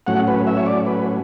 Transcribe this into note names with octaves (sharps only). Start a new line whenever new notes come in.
A2 F#3 C#4 F#5
B4
E5
C#5
D5
B4